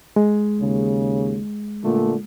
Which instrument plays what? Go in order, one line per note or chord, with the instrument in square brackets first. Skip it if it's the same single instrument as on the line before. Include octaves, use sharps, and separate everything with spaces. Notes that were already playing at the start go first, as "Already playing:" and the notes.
[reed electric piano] G#3
[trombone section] D#2 C#3
A#2 D3 A3